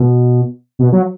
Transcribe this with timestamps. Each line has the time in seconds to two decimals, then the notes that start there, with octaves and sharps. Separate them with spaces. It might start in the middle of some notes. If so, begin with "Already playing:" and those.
Already playing: B2
0.79 B2
0.92 F#3